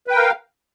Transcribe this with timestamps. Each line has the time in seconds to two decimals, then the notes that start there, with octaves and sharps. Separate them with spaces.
0.07 B4
0.11 G5
0.15 A#4
0.18 F5